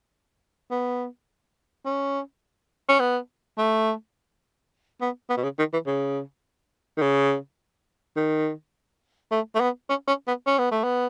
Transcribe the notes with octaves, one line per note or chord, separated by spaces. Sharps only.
B3
C#4
C#4
B3
A3
B3
B3
B2
C#3
D#3
E3
C#3
D#3
C#3
D#3
A3
A3
B3
C#4
C#4
B3
C#4
B3
A3
B3